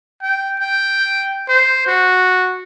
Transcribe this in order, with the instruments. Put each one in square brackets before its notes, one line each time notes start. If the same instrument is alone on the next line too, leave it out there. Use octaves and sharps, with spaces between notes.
[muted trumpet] G5
G5
C5
F#4